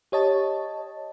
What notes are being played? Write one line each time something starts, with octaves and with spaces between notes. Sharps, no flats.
G4 C#5 D#5 A5